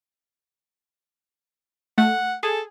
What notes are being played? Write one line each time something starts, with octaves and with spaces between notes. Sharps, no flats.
A3 F#5
G#4 A4